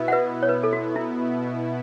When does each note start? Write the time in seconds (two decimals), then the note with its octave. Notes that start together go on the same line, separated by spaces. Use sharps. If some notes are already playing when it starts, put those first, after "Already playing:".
Already playing: B2 B3 E4
0.08 F#5
0.12 B4 E5
0.43 C#5
0.49 B4
0.63 A4
0.73 F#4
0.96 E4